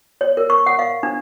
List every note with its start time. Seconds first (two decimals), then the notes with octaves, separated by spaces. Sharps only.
0.21 C#5
0.37 A#4
0.50 C#6
0.66 F#5
0.79 F5
1.03 D4